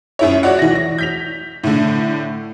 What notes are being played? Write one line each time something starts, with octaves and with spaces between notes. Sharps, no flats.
F#2 E4 C#5
F#4 C#5 D5 F#5
E3 A#6
A#6
G6 B6 F7
A2 D3